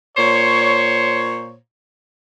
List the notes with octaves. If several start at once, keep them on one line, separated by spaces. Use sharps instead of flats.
A#2 C5 C#5